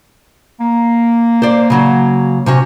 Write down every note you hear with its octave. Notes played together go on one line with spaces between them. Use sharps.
A#3
C5 D5
C#3 F#3 F#4
C3 C#4 F#4